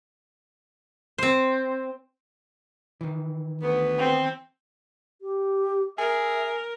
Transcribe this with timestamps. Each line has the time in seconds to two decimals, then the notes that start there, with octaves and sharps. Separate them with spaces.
1.18 C4 C5
3.01 D#3 E3
3.62 D2 B3
3.99 C4
5.22 G4
5.98 G#4 A#4 E5